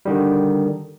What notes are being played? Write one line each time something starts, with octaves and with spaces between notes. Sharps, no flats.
D3 D#3 G3